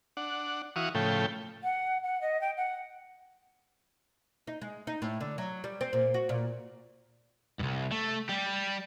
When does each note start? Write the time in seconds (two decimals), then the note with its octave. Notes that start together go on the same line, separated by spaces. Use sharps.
0.17 D4 F#5
0.76 E3 F#4 F5 C#6 D#6
0.95 A2 C#3 F3 A3 G5
1.63 F#5
2.04 F#5
2.21 D#5
2.41 G5
2.57 F#5
4.47 D#4
4.61 G#3
4.87 D#4
5.02 A2
5.21 D3
5.38 F#3
5.64 G3
5.81 C4
5.93 A#2
6.14 F#4
6.29 A#2
7.59 C2 G2
7.92 A3
8.29 G3 G4